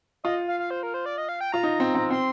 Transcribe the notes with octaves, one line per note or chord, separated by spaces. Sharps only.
F4 D#5
F5
F5
C5
A#4
C5
D5
D#5
F5
G5
F4 A#5
D#4
C4
C4
C4 C6